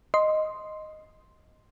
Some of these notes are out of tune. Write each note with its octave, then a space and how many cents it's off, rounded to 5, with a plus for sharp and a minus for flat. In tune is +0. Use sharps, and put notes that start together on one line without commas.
D#5 +0 C6 +0